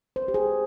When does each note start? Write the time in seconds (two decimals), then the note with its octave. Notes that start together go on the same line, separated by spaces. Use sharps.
0.16 C5
0.22 B4
0.28 G4
0.34 G#4